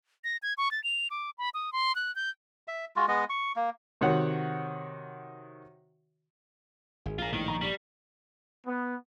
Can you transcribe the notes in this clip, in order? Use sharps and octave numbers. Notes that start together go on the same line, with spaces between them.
A#6
G#6
C#6
A6
F7
D6
B5
D#6
C6
F#6
G6
E5
G#3 F4 F#4
G#3 B3 D#5
C#6
A#3
C3 D#3 F#4 C#5 F#5
G#1 G#4
A#1 G#2 F4 A#4
A2 D#3 D7 G7
A#5 C#6
G3
B3